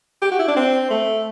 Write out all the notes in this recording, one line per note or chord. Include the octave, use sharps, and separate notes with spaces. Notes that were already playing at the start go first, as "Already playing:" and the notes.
G4
F#4
E4
D4
C4
A3